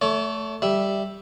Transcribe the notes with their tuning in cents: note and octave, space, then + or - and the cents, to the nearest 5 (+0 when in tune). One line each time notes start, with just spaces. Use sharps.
A3 +0 C#5 +45
G3 +0 E5 +0